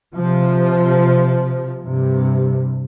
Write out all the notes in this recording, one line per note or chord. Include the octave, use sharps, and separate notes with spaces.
C3 F3
G2 C3